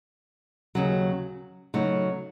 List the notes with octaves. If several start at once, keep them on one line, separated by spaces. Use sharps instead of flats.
D#2 C#3 F#3
C#3 F#3 A3 D#4 F#4